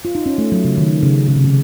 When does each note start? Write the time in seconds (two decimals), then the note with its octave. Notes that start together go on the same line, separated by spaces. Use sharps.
0.05 F4
0.15 D#4
0.26 C#4
0.38 A3
0.52 F#3
0.64 C#3
0.77 D#3
1.03 C#3
1.28 C#3
1.36 C3
1.44 C#3